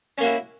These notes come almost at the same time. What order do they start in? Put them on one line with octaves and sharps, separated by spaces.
C#4 A#3 F#4 E4